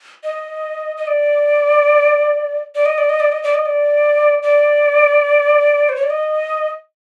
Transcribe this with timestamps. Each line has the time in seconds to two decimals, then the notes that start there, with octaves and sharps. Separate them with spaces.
0.24 D#5
0.97 D#5
1.07 D5
2.75 D5
2.86 D#5
2.98 D5
3.09 D#5
3.20 D5
3.32 D#5
3.43 D5
3.54 D#5
3.66 D5
4.43 D5
5.89 C5
5.96 C#5
6.03 D5
6.10 D#5